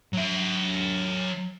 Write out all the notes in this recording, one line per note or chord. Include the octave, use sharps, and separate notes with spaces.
F#3 E5